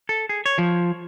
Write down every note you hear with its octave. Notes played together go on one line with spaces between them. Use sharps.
A4
G#4
C#5
F3